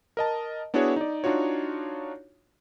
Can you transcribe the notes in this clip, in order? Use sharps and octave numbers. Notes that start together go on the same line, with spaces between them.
A#4 D#5 A5
B3 D4 E4 F#4 G#4 C#5
D#4 D5
D4 D#4 F4 F#4 C#5